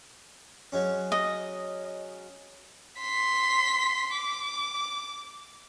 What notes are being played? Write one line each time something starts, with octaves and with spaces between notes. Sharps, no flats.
F#3 G#3 C#4
D#5
C6 B6
D6